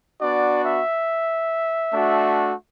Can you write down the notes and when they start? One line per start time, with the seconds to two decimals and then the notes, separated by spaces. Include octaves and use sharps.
0.21 B3 D4 F#4 D5
0.64 E5
1.94 A3 D4 F#4